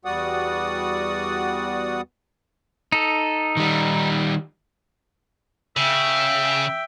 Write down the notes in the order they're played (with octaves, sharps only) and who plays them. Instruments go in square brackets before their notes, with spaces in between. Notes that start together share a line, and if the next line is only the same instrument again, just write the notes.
[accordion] E2 G3 F#4 D5 F#5 D#6
[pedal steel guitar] D#4 A4
[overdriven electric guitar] D#3 G3
[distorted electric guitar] C#3 [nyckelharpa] E5 G5